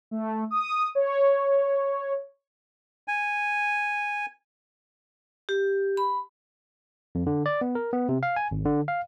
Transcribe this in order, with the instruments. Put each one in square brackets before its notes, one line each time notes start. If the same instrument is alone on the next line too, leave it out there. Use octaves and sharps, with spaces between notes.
[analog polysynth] A3
D#6
C#5
[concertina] G#5
[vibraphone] G4
B5
[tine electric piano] F2
D3
D5
B3
A#4
B3
C3
F5
G#5
G#1
D3
F5